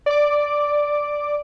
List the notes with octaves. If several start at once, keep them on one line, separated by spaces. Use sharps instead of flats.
D5 D6